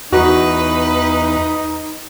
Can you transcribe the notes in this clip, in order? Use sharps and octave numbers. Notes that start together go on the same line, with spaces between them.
E2 D#4 F#4 B4